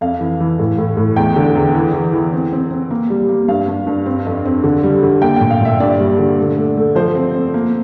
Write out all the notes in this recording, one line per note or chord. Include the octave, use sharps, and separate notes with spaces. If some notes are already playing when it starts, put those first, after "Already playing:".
F2 F5
E3
E3
A2
A2
A2
E2 G5
D3
E2
E3
E3
E3
C4
C4
C4
A#3
G3
A#3
G2 F5
G2
G2
C4
F2
C4
D3
G3
D3
A#3 G5
A#2 G5
F5
A#2 E5
G2 D5
G3
D3
A3
A3
A3
F3 C5
C4
C4
A#3